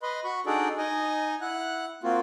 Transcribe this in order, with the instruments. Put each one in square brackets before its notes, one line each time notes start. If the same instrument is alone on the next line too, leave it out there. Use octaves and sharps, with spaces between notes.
[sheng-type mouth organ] B4 D#5 B5 C6
F#4 B5 C#6
D4 D#4 F#4 G#4 A4 D5
D#4 D#5 G#5
E4 F#5 F#6
A#3 C4 F4 F#4